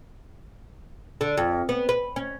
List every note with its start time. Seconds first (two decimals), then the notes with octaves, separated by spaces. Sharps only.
1.21 D3
1.37 F2
1.69 B3
1.89 B4
2.16 C#4